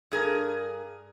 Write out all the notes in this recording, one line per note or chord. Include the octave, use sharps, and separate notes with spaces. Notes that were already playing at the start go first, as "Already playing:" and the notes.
G2 G#4 A#4